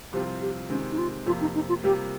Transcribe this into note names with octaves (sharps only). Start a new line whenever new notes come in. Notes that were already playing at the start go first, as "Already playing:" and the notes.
C2 C3 F3 C4 F4 G4
G4
C3 D#3 G#3 C4 C#4
D#4
F4
F2 C3 F3 A#3 F4
D#4
D#4
F4
C3 G3 A#3 F4 G4